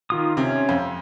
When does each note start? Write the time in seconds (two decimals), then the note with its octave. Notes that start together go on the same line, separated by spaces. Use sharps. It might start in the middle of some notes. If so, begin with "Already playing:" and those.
0.10 D#3 F4 D#6
0.37 C3 C#4
0.69 F2